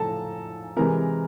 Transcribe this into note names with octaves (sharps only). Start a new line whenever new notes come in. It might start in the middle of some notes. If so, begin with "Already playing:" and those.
Already playing: A2 F3 A4 A5 A#5
C3 E3 G#3 A#4 A#5